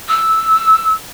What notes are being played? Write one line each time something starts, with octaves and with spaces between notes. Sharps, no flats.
E6